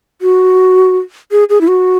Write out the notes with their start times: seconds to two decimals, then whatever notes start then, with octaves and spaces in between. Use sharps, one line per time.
0.22 F#4
1.32 G#4
1.49 G#4
1.61 E4
1.68 F#4